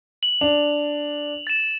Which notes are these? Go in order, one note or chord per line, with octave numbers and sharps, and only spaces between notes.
F#7
D4 F7
A6 E7